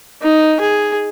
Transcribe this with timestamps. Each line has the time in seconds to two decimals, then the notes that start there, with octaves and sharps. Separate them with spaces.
0.22 D#4
0.60 G#4